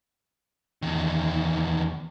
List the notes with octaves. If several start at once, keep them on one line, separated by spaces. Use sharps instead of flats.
E2 D#3